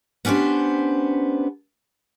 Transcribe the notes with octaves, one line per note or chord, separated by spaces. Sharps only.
B3 C#4 D4 G4 C5